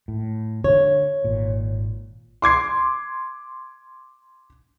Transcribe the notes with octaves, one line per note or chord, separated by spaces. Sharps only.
A2
D3 C#5
G#1 A#2
C6 D6 G#6 C7